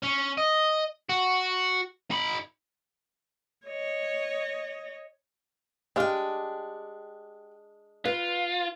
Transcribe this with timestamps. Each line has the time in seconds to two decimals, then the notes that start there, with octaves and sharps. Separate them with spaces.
0.03 C#4
0.37 D#5
1.09 F#4
2.11 D#4 B5
3.66 C#5 D#5
5.96 G#3 D4 G4 F5 G5
8.05 F4 B4